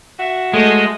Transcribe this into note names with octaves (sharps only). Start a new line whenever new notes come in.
F#4 E5
G#3 A3 D#5